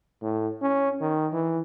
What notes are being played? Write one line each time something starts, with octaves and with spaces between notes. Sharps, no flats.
A2
C#4
D#3
E3